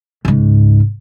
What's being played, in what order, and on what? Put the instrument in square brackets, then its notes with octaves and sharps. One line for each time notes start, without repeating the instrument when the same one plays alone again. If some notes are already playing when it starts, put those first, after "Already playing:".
[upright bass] C#2 G#2